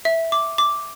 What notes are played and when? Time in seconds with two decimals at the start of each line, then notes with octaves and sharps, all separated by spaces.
0.05 E5
0.32 D6
0.58 D6